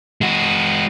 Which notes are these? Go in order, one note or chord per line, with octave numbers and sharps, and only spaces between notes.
G#3 F#4